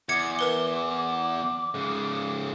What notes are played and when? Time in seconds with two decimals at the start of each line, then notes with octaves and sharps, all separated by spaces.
0.09 E2 D6 G#6 C#7
0.39 A#4 B4 G7
1.75 G#2 C#3